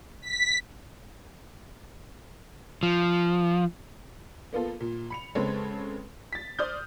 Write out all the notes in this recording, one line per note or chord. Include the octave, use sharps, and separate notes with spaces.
B6
F3
A#3 B3 F4 A4
A#2
B5 C#7 F7
C#3 G#3 C4 A4 B4 C#5
A6 B6
C5 D5 D#6 F6 G6